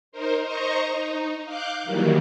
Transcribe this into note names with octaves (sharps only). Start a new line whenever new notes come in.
D#4 A#4 C5
C5 D#5 A#5 C#6
D#4
F5 D6 F#6 G6
D#3 E3 F#3 G3 A#3